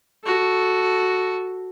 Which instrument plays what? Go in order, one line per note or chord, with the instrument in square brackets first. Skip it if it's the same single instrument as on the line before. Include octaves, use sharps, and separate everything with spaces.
[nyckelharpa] F#4 A4